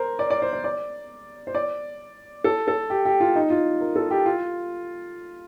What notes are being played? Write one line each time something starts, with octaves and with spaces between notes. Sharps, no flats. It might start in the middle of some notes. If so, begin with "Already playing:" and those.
Already playing: A#4 C5
D5
D5
C5
C5
D5
C5
D5
A4
A4
G4
G4
F4
D#4
F4
A#4
A4
G4
F4